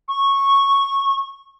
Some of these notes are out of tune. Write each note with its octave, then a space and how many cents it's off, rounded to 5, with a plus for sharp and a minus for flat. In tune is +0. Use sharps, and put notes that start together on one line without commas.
C#6 -10